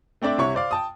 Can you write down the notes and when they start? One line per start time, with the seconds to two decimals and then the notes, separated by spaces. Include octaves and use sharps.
0.22 A3 C4 D4 D5 E5
0.38 C2 C3 E4 C#5 C#6
0.55 C5 D5 F5
0.71 G5 A5 D#6